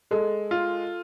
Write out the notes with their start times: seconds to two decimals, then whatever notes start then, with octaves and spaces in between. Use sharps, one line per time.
0.11 G#3 A4
0.51 F4